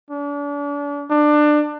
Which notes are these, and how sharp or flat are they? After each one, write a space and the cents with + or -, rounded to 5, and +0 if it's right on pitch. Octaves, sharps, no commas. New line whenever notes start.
D4 -35
D4 +20